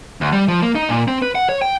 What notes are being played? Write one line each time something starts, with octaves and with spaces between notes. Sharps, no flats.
D2
G3
F3
A#3
D#4
A#2
C4
B4
F#5
C#5
G5